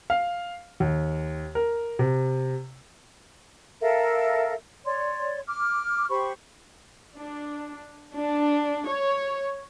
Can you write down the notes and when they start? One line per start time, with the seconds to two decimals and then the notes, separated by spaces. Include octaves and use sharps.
0.10 F5
0.80 D#2
1.55 A#4
1.99 C3
3.81 A4 A#4 E5 F5
4.85 C#5 D5 C6
5.46 D6 F6
6.09 G4 C5 B5 C#6
7.17 D4
8.15 D4
8.88 C#5